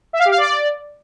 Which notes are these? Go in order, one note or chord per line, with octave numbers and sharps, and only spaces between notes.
E5
F5
G4
F5
D5